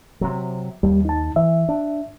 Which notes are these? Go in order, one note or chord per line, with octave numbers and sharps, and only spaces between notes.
C3 F#3
D#2 G3
D#4 A5
E3 E5
D4